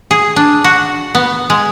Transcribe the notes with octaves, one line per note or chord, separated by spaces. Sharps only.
G#4
D4
F#4
B3
G#3